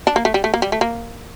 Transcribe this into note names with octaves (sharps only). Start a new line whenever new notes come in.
D4
A#3
A3
G3
A3
A#3
G3
A3
A#3